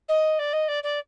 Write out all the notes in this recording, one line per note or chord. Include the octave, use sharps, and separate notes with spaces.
D#5
D5
D#5
D5
D5